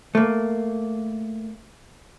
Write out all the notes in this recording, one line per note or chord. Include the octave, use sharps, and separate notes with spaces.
A3 A#3